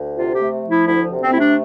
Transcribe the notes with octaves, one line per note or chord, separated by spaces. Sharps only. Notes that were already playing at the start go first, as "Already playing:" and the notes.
Already playing: D2
C3 F4
G4
A3
F3
E4
D2 E4
C3
C4
A3 E4
D4